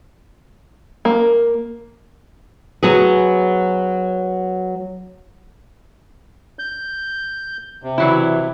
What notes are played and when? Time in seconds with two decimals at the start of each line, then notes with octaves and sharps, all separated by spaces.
1.05 A#3
2.83 F#3 B3 G#4
6.59 G6
7.83 C3
7.98 E3 F#3 E4